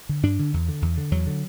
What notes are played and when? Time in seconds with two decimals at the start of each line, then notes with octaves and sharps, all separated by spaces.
0.09 D3
0.23 G2 D4
0.39 D3
0.54 E2
0.68 D3
0.82 E2
0.97 D3
1.11 E2 F#3
1.27 D3